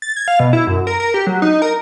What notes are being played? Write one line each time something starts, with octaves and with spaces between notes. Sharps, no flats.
A6
G#6
F5
B2
E4
F#2
A#4
A#4
G4
F#3
D#4
A#4